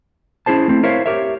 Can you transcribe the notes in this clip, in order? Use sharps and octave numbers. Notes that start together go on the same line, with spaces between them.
C#4 E4 G#4 C5 A5
A3 C4 C#4 E4
E4 A#4 C5 C#5 E5 F5
G4 A#4 C#5 E5